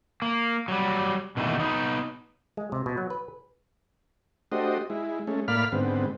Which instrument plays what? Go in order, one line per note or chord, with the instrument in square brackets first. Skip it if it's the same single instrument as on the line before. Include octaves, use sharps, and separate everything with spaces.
[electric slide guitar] A#3
F#3 G3
B2 D#3 E3 A3 A#3
B3 D#4
[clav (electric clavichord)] G#3
C3
B2
F#3
B4
[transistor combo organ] A3 D4 F#4 G4 C5 D#5
G#3 E4
G#3 A3 C#4
A2 A#3 D5 F5 B5 F6
G#2 D3 B3 C4